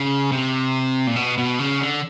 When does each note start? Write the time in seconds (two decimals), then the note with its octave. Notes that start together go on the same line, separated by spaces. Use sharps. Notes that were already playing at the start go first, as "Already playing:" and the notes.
Already playing: C#3
0.32 C3
1.07 A#2
1.16 B2
1.38 B2
1.60 C#3
1.80 D3